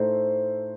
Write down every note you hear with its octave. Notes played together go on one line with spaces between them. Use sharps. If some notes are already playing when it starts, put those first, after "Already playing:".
Already playing: A2 A3 D#4 A4 C5